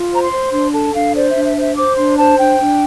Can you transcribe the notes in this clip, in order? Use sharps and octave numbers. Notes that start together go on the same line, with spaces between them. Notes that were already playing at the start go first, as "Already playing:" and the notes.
Already playing: F4
C5 A#5
C6
C5
D4 C6
A4 A5
D4 F5
C5 D5
E5
D4
E5
C5
E5
C5 D6
D4 C6
C5 A5
D4 G5
D4